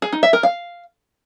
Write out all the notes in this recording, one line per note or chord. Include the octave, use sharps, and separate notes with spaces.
G#4
D#4
E5
A#4
F5